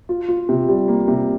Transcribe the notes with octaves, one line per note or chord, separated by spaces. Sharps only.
F4
F4
C3
G3
A#3
C3